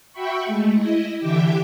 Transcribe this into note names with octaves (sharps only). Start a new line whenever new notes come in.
F#4 E5 G5 B5 C#6
G#3 A3
E4 D#5
D3 E3 G4 E5 G5 D6